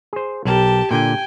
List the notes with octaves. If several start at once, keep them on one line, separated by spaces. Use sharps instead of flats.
G#4 C5
B1 G4 A#4 A5
A#2 D3 G5 G#5